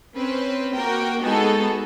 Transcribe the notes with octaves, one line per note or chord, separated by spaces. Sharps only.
C4 C#4 B4 C5
A#3 F#4 A#4 G5
G#3 B3 D#4 F#4 G#4 A4